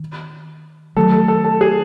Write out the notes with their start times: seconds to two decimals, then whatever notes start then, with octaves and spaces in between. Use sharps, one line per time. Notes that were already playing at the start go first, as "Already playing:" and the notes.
Already playing: D#3
0.96 D#3 F#3 A3 A4
1.12 A4
1.28 A4
1.44 A4
1.61 G#4